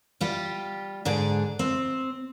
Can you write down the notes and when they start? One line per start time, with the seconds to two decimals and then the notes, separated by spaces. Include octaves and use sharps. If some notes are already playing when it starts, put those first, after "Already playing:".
0.21 G3 F4 G4
1.05 G#2 D3 G#4 D5
1.59 C4